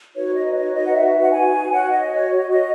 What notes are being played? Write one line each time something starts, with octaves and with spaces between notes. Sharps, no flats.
D#4 F#4 B4 C#5
D#5
C#5
D#5
F#5
E5
F#5
G#5
F#4 C#5 F#5
D#5
C#5
D#5
D#5